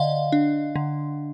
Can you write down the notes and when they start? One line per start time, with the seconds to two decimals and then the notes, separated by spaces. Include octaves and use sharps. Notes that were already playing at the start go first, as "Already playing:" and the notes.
Already playing: D3 D5 D#5 F5
0.32 D4
0.76 D3